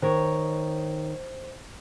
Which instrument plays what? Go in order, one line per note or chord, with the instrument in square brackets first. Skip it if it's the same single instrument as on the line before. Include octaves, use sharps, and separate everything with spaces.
[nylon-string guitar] D#3 A#4 C#5 [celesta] C5